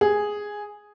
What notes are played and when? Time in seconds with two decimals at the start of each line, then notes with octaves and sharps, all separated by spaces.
0.01 G#4